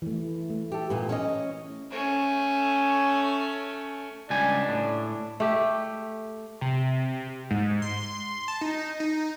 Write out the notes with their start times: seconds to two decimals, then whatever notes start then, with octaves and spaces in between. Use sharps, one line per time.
0.02 E3 A3
0.50 A3
0.72 G4 A4
0.90 A#2 B3
1.09 C#4 C#5 D#5
1.91 A3 C#4
4.30 C#2 G3 D4 G#5
4.69 A2
5.40 A3 G4
6.61 C3
7.51 G#2
7.82 C6
8.48 A5
8.61 D#4
9.00 D#4